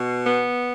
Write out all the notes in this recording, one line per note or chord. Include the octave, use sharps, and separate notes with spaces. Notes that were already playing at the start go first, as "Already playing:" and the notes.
Already playing: B2
B3